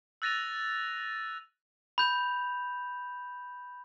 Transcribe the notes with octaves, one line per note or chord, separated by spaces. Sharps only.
E6 F#6 A6 A#6 D#7 F7
B5 G6 F7